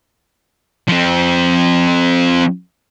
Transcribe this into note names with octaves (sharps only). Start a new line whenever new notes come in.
F3 C4